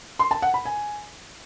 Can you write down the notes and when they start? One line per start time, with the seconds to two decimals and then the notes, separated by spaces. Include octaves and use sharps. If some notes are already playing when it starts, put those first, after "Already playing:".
0.19 C6
0.31 A5
0.42 F#5
0.54 B5
0.65 G#5